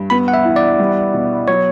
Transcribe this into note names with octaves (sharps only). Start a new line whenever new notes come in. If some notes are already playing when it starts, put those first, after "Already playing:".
Already playing: G2
B3 B5
F#5
E5
E3
D5
G3
B2
F#3 C#5